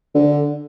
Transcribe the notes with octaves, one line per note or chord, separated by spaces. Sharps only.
D3